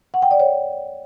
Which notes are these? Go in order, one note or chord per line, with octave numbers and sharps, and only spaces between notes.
F#5
G5
D5
C#5